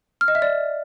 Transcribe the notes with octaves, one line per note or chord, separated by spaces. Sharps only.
F6
D#5
E5
D5